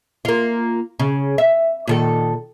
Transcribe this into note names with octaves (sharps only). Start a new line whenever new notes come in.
A#3 F4
C#3
E5
A#2 D#3 A4